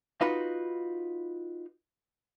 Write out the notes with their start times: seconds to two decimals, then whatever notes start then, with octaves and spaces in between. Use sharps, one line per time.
0.21 D#4 F4 F#4 B4 D#5 F5